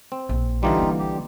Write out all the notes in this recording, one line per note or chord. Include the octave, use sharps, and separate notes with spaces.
C4
A#1
D3 E3 G3 D#4 F4 G4
A#3 C4
G4